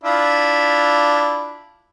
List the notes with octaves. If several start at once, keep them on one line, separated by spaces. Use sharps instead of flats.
D4 E4 F4